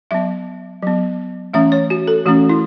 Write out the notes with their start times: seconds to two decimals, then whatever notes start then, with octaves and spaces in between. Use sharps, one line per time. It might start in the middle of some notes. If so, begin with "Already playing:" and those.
0.11 F#3 B3 E5
0.82 F#3 B3
1.53 E3 A3 C#4 E5
1.72 C#5
1.90 F#4
2.07 A4
2.26 E3 A3 C#4 F#4
2.49 E4